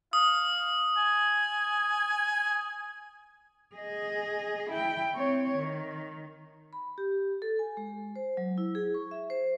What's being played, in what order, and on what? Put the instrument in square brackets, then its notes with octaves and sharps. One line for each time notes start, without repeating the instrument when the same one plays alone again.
[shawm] F5 [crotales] D#6
[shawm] G#5
[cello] G#4 D#5
E4 G5
C4 C#5
D#3
[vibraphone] B5
G4
A4
G#5
G#3
C5
F#3
E4
G#4
C#6
E5
C5